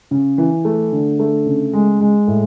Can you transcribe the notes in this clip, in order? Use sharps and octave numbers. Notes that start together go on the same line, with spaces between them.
C#3
E3
A3
D3
A3
C#3
G#3
G#3
A2